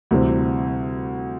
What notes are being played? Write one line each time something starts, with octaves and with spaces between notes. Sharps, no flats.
D2 C3 E3 G3 C4